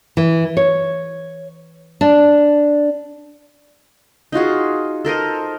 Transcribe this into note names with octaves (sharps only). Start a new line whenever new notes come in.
E3
C#5
D4
D#4 F4 F#4 G#4
A4 A#4 C5 D#5